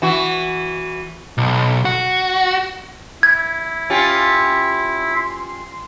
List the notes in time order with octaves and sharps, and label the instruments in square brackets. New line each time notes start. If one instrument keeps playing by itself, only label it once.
[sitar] E3 F#4
[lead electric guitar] B1
F#4
[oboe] E4 [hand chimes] G#6
[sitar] C#4 F4 G4
[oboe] C6